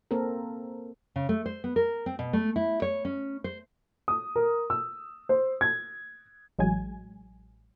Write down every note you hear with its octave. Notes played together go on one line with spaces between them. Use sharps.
A#3 C4 A4 A#4
C#3
A3
C5
B3
A#4
C4
B2
A3
E4
C#5
C#4
C5
D#6
A#4
E6
C5
G#6
A1 F#3 G#3 G#5 G#6